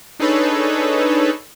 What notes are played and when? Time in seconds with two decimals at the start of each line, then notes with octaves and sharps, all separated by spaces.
0.19 D4 D#4 G#4 A4 B4 C#5